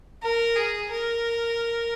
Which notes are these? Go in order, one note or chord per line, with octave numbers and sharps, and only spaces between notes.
A#4
G#4
A#4